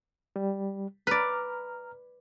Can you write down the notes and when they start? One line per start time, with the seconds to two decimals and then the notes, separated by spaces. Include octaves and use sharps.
0.36 G3
1.07 B4 D5 A#5 F6